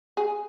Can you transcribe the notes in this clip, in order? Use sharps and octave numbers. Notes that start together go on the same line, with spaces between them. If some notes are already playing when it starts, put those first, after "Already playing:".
G#4